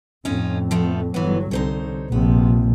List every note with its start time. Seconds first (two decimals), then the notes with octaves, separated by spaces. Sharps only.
0.25 F2 A2 C#4 D#4 F4
0.71 F3 A3 B3
1.14 G1 E3 F#3 B3
1.51 C2 D3 D#4 C5 C#5
2.12 A#1 C3 F3 B3